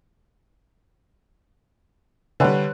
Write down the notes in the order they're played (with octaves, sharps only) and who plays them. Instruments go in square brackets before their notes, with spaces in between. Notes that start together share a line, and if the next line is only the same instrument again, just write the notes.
[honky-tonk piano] D3 G3 [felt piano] B4 C#5 F#5